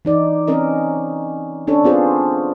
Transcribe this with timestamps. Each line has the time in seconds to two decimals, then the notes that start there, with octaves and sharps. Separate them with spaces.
0.05 E3 D#4 D5
0.48 C4 C#4 A#4 D#5
1.67 C#4 D4 A4 C#5
1.84 B3 C4 F4 G#4 C5